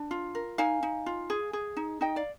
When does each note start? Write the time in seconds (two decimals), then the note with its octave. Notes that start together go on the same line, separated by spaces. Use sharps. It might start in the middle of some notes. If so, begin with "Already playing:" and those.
Already playing: D4
0.11 F4
0.35 A#4
0.58 D#4 F5 G#5
0.83 D#4
1.06 F4
1.30 G#4
1.53 G#4
1.77 D#4
2.01 D#4 D#5 G5
2.16 D5 F5